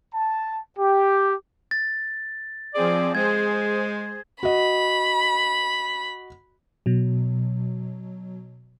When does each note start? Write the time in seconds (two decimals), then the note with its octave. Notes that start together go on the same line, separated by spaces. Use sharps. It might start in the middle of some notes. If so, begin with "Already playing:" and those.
0.14 A5
0.78 G4
1.71 A6
2.74 F3 C4 G#4 D5
3.15 G#3 G#4 C5 G#6
4.43 F#4 D#5 B5
6.86 B2 F#3